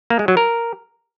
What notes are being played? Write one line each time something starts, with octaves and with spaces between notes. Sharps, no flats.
A#3
G#3
F#3
A#4